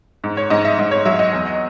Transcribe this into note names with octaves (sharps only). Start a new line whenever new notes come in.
G#2
C#5
G#2 D#5
E5
G#2 D#5
C#5
F#3 E5
D#5
E2